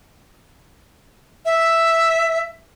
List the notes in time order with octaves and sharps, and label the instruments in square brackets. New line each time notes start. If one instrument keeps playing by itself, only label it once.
[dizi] E5